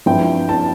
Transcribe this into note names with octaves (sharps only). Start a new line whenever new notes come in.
G2 F3 C4 E4 G5
A5